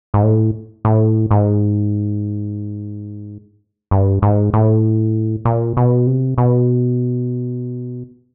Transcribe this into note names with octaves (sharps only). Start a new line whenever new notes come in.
G#2
A2
A2
G#2
G2
G#2
A2
A#2
B2
C3
B2